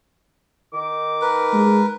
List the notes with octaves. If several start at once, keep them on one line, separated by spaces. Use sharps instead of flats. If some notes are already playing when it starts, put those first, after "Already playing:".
D#3 D6
A#4 B4
G#3